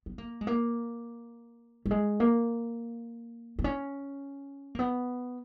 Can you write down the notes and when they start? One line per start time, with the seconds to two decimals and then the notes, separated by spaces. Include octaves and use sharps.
0.06 B3
0.18 A#3
0.41 G#3
0.47 A#3
1.86 G3
1.91 G#3
2.20 A#3
3.59 B3
3.64 C#4
4.75 A#3
4.79 B3